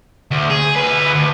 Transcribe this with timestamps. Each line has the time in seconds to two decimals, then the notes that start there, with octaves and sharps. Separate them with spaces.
0.31 D2
0.50 G#4
0.76 D2 B4
1.15 D2